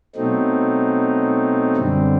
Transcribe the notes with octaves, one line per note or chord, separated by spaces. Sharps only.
B2 F#3 A3 C4 D#4
F#2 D3 G3 C4